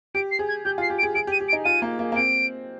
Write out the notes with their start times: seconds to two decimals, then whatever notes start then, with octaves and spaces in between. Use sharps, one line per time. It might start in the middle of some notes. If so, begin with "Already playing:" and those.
0.15 G4 D7
0.31 C7
0.39 G#4
0.49 G#6
0.65 G4 G6
0.78 F4
0.82 C7
0.90 G4
0.99 D7
1.03 G#4
1.15 G#4 D7
1.27 G4
1.32 D#7
1.41 G4
1.49 D7
1.53 D#4
1.65 F4 D#7
1.82 A#3
1.99 A#3
2.12 A#3
2.15 C4 D7